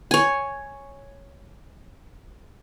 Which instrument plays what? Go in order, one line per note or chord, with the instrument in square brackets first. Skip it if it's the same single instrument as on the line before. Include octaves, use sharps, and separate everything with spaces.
[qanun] C#5 G#5